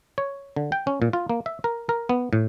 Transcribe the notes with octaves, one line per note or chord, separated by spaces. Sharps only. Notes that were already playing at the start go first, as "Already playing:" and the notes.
C#5
D3
G5
C#4
A#2
F4
A#3
E5
A#4
A#4
B3
A2